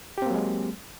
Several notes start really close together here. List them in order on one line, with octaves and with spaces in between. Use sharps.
G4 C4 A#3 F#3 G#3